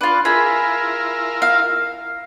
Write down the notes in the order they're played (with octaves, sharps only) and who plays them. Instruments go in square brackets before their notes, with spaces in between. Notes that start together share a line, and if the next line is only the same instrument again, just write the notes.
[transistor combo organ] D4 [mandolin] F4 B4
[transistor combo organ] E4 F4 A#4 [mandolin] G#4 B5
[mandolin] F5